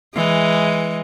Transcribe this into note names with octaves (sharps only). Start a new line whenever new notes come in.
E3 G#3